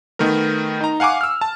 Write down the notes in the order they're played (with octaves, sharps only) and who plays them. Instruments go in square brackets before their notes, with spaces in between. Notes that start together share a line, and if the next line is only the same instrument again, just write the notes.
[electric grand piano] D#3 A3 B3 A#4
D#4 A#5
F5 F#5 G#5 C#6 D6
E6 F6
A5